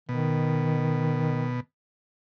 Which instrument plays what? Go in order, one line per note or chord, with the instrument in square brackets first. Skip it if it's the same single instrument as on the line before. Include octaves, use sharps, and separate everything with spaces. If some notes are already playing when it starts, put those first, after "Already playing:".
[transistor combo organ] B2 [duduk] D#3